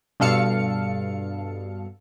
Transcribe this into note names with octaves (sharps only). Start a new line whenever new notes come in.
G2 B2 A4 F5 C#7